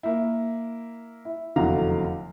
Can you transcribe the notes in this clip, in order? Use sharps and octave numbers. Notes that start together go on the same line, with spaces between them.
A#3 E4
E4
F1 E2 D3 F#3 F5 A#5